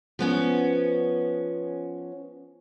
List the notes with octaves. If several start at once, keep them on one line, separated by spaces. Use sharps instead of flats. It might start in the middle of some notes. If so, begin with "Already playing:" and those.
F3 B3 C#4